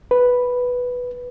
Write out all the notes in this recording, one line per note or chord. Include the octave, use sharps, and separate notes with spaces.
B4